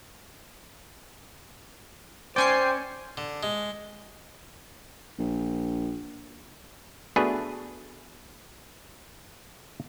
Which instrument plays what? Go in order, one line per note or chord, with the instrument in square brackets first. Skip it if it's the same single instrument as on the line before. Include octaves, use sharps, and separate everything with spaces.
[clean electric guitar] C#4 D5 [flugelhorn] C5 [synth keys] G5 G#5 C7
[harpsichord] D3
G#3
[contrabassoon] A#1
[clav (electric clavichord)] A3 B3 D4 F#4 G#4 B4